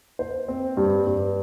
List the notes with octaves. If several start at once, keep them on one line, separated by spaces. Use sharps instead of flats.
C5
C4
G2
G2